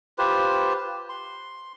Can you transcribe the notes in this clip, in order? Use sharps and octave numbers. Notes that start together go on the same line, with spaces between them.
F4 G4 B4 C5
C6